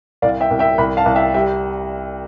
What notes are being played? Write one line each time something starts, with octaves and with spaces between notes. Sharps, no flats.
C2 D5 F5
E5 G5
C2
E5 G5
C2 G5 B5
F5 A5
C2
E5 G5
G3 E5 G5